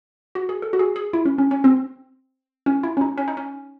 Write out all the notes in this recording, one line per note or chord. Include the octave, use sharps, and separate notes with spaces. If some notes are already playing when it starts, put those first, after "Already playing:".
F#4
G#4
A4
F#4
G#4
G#4
E4
C#4
C#4
C#4
C4
C#4
E4
C#4
D#4
C#4
D#4
C#4